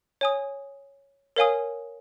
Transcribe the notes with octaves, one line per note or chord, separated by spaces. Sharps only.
C#5 G#5 D#6
A#4 C#5 F5 G#5 D#6